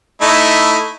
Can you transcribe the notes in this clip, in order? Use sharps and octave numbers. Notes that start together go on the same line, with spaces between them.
A3 D#4 E4